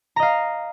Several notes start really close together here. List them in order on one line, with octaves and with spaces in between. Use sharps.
A#5 D#5 F5